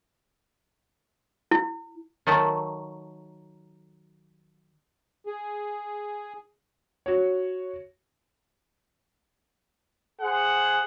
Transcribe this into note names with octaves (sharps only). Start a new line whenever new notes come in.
E4
D#3 F#3 A3 A4
G#4
F#4 C#5
G#4 C5 F#5